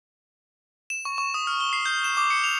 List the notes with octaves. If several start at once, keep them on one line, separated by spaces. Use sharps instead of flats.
E7
C#6
C#6
D#6
F6
G7
C7
G6
E7
D6
C#7
F7